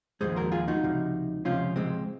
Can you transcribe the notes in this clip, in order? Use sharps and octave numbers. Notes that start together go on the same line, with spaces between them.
D#2 C#3 F3 G#3 G#4 C5
F#4 A#4
F4 G#4
D#4 F#4
C#2 C3 F3
C#2 C3 F3 C#4 F4
G#3 C4